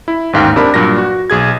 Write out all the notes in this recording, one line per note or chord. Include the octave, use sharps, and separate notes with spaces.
E4
A1 D#2 G#2 F5 G5
C3 D4 A#4 B5
G2 A#2 F#3 A#6
F#4
B1 G#4 G#6